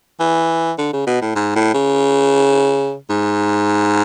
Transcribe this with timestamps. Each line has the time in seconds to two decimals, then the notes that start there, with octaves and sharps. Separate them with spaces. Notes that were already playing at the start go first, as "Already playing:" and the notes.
0.20 E3
0.78 D3
0.93 C#3
1.07 B2
1.22 A2
1.36 G#2
1.55 A2
1.74 C#3
3.10 G#2